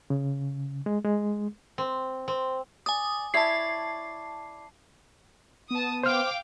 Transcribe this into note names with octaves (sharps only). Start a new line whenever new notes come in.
C#3
G#3
G#3
C4
C4
D5 G#5 D#6
E4 C#5 D5 A5 C7
B3 A5 D#6
C5 F5 G5 D6 F6